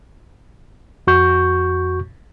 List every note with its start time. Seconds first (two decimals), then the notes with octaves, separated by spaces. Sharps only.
1.07 F2 F#4 C#6 G6